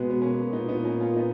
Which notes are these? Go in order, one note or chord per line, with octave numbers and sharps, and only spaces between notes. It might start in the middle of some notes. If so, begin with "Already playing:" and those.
Already playing: B2 G#3 B3
B3
A#3 C#4
A#2 B3 D#4
B3 D#4
A#3 C#4
C#4 F4
B3 D#4